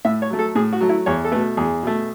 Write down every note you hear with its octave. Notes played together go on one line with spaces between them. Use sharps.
A2 E5
C#5
F#3 A3
A4
A2 G#4
F#4
F#3 A3
E4
E2 C#5
A4
B2 A3 B4
E2 G#4
B2 A3